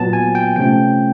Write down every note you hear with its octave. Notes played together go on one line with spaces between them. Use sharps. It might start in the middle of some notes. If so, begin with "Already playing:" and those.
Already playing: A#2 F#3 B3 A5
G#5
G5
C3 F3 A3 C#4 G5